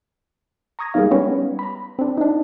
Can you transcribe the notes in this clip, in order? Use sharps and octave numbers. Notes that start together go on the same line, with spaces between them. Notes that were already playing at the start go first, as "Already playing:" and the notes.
A#5 C#6 D#6 G#6 A#6
G3 G#3 A#3 B3 D#4 F5
G3 B3 C#4 G4 B4 C#5
A#5 B5
C4 D4
D4 D#4